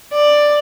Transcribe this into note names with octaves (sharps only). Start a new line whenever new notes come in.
D5